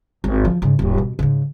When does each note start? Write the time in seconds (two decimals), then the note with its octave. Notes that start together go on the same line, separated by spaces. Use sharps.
0.24 G#1
0.45 F3
0.62 G#2 C#3
0.79 D#1 G#2
0.98 B2
1.19 G#2 C#3